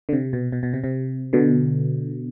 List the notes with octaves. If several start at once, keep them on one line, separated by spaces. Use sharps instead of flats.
D3
C3
B2
B2
B2
C3
C3
B2 D3